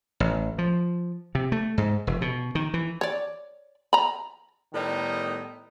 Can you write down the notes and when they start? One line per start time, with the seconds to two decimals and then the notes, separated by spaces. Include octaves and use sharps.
0.20 A1
0.58 F3
1.35 C3
1.52 A3
1.78 G#2
2.07 F1
2.21 B2
2.55 D#3
2.74 E3
3.01 C#5 D5
3.93 A#5 B5
4.73 A2 D#3 G3 B3 D#4